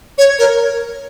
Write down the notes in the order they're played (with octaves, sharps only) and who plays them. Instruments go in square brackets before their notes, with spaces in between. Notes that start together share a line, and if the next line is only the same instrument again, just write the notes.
[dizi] C#5
A#4